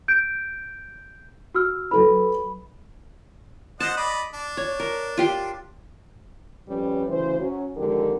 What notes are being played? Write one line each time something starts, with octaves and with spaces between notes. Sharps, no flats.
G6 D7
F#4 E6 F6
F#3 A4 B4 B5
C5 D#5 F#5 A5
D5 D#5 B5
D4
C#5
A#4
F4 G4 C6
F2 G3 C#4 B4
D2 C#3 E3 C5
F#3 C#4
F2 D3 D#3 G#3 G4 A#4